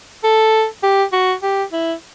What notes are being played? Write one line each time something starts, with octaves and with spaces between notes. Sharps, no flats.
A4
G4
F#4
G4
E4